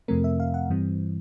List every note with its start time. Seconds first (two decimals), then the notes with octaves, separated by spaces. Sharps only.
0.08 F2 C3 F3 A3 C4 A#4
0.24 E5
0.40 F5
0.54 F#5
0.70 G2 E3 G3 C4